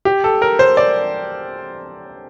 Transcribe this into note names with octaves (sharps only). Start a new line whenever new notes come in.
G4
A4
A#4
C5
D5